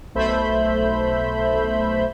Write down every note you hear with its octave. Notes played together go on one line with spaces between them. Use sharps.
B1 A3 C5 E5 B5 G6